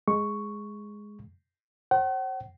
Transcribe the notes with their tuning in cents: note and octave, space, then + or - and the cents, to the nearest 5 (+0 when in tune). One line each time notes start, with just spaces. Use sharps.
G#3 +0 C#6 +0
C5 +45 F#5 +45